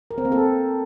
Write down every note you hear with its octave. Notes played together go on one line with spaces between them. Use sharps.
A#4
C4
A#3
A4